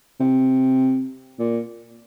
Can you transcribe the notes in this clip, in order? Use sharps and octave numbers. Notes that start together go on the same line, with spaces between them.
C3
A#2